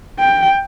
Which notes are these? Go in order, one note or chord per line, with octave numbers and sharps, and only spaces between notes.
G5